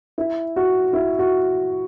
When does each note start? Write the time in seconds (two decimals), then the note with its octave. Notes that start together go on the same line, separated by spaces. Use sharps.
0.18 E4
0.56 F#4
0.93 E4
1.19 F#4